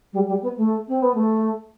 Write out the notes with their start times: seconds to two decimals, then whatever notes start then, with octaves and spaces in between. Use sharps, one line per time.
0.13 G3
0.27 G3
0.42 B3
0.57 A3
0.88 C4
1.02 B3
1.14 A3